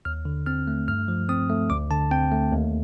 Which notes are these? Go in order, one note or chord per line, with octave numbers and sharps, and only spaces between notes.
D#2 F6
D3
C4 F6
A3
G2 F6
F3
C4 D#6
A3
D2 D6
D3 A5
C4 G5
A3
D#2